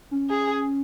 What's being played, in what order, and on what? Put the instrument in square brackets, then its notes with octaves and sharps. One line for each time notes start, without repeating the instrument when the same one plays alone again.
[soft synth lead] C#4
[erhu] G#4